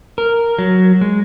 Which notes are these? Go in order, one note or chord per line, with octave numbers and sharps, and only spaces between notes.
A#4
F#3
G#3